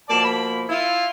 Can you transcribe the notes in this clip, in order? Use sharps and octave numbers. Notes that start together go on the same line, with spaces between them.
B2 F3 A#3 D5 A5
B5
E4 F4